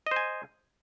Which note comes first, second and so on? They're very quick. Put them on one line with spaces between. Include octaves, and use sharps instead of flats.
D#5 C5 G#5